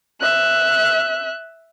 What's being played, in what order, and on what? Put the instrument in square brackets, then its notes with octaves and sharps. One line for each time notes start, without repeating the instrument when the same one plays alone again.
[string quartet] E5 F#6